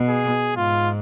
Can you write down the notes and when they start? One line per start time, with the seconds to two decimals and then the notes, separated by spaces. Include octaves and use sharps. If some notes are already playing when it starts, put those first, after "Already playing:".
Already playing: B2
0.09 G#4
0.56 G#2 F4